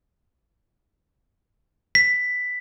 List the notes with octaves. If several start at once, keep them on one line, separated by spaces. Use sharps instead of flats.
B6